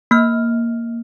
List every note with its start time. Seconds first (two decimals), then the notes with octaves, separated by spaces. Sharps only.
0.11 A#3 F6